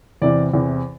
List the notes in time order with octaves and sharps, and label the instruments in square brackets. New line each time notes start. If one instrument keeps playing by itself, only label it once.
[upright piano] E2 C3 E3 D5
E2 C3 E3